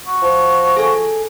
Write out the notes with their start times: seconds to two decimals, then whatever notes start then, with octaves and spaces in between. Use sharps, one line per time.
0.06 F#4
0.22 F3
0.77 G#4 A4 G#5